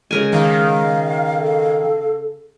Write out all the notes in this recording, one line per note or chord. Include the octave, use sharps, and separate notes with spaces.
C#3 G#3 A#4 G#5
D#3 F5
A4